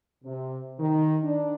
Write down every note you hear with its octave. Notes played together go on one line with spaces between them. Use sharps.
C3
D#3
D4